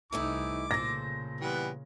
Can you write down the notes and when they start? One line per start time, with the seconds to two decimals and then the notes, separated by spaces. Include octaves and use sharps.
0.12 C2 E3 A3 D#4 E4 D6
0.71 A#2 C#3 A4 C5 A#6
1.41 E3 G3 B3